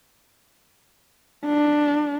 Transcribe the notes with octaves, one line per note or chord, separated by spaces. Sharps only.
D4